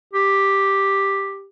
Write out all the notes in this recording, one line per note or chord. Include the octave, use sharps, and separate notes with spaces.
G4